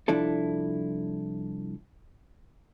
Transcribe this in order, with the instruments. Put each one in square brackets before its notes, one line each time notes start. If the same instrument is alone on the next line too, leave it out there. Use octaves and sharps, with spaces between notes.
[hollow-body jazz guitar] C2 F3 D4 E4 A4